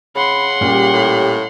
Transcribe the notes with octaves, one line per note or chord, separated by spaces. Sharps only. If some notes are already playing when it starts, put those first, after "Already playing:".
C#3 F#5 B5 C6
A#2 G3 C#4 G4
A2